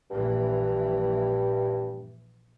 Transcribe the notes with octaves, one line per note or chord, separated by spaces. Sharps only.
A#1 G2 E3